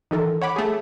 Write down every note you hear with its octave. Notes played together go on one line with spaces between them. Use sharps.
D#3 E3 A4 A#4
C#5 F#5 B5 D6
A3 G#4